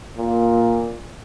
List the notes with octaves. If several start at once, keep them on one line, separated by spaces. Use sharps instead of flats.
A#2